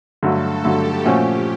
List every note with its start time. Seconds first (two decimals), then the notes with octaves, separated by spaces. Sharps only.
0.23 G2 D3 F#3 A3 A4
0.64 G2 D3 F#3 A3 G4
1.05 A#2 F3 A3 C#4 F#4 G4